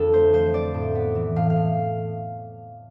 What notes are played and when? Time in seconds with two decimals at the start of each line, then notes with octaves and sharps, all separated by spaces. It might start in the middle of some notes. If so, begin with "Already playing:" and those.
Already playing: F2 D3 A4
0.13 A3 C5
0.33 F3 C5
0.54 C4 D5
0.74 A2
0.95 B3
1.15 E3
1.36 A2 F5
1.50 F5
1.56 A2